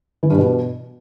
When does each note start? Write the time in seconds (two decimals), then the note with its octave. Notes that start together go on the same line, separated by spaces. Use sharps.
0.23 E3
0.30 G2
0.38 B2